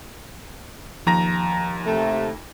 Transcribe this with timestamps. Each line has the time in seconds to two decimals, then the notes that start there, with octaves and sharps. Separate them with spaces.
1.07 D#2 F3 A#5 A#6
1.86 C3 A3